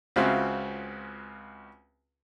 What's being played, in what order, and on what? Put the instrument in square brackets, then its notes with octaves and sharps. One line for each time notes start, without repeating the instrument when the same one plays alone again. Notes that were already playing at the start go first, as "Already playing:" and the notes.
[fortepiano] C#2 C#3 C4 F4 F#4 E5